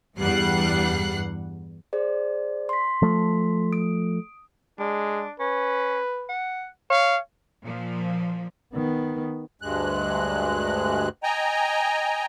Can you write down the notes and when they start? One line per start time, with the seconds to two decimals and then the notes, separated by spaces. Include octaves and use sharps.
0.19 E2 G2 G3 F#5 F#6 C7
1.93 G#4 C5 D5
2.69 C6 B6
3.02 F3 A3
3.72 D#6 D7
4.79 G#3 D4
5.40 C#4 B4
6.29 F#5
6.90 C#5 F5
7.62 A#2 F3
8.74 D#3 B3
9.62 D2 G2 G#3 F#6
11.23 D#5 G5 G#5 A#5